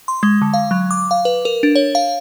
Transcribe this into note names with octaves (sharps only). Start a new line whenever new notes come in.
C6
G#3
D3
F5
F#3
D6
F5
B4
A#4
D4
C#5
F5